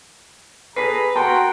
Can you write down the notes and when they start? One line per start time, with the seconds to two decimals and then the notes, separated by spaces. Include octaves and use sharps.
0.76 G#4 A4 B4 A#5 B6 C7
1.16 F#4 A#4 F#5 G5 A5 C6